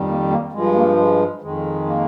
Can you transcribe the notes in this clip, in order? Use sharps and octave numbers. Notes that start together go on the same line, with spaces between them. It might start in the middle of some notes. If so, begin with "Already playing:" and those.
Already playing: F2 D#3 G3
A#3
A#3
G2 F3 G#3
A#3
G#3
F2 D#3 G#3
A#3